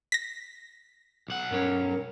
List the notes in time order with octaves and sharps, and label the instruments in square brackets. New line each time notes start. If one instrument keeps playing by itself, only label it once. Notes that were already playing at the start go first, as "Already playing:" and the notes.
[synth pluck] A#6 B6
[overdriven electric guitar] B1 F#5
[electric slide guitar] G2 C#4 C#5 [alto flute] A#4